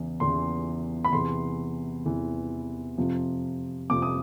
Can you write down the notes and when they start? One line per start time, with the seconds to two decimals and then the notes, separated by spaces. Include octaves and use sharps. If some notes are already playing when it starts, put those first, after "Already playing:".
Already playing: E2 C#3 E3
0.20 E2 C#3 E3 C6
1.05 B5
1.13 E2 C3 E3 C6
2.05 E2 C3 E3
2.98 F2 C3 F3
3.90 F2 C3 F3 D6
4.02 D#6